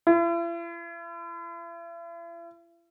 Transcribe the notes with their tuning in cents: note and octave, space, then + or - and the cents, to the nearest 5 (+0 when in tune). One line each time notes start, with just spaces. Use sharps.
E4 +45